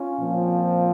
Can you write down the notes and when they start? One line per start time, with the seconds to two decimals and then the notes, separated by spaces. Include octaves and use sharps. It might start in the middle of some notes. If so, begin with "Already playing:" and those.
Already playing: C#4 F4
0.19 A#2 F3 C4